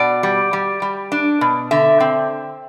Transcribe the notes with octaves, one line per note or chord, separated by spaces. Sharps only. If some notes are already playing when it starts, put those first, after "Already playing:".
Already playing: B2 D5
G3
G3
G3
D4
B2
D3 E5
C4